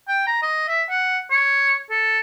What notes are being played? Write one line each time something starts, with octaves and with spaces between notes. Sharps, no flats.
G5
A#5
D#5
E5
F#5
C#5
A4